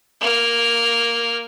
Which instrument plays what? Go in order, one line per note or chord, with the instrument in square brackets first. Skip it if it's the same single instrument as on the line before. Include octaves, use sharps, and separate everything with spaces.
[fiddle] A#3 F6